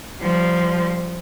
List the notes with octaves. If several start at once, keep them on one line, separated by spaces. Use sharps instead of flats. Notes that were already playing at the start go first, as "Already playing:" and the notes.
F3 G3